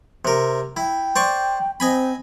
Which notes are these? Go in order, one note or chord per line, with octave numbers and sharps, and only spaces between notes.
C3 A#4
E4 G5
C5 D5 C#6
C4 D#5 G#5 B5